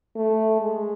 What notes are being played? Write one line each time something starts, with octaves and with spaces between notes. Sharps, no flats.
A3
G#3